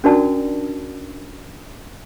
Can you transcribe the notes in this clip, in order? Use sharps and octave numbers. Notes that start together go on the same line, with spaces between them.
C#4 D4 F#4 A#4 D5 A5